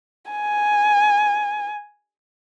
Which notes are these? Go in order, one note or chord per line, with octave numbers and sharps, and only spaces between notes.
G#5